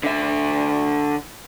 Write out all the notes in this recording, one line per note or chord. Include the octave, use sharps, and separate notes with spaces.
D3 E5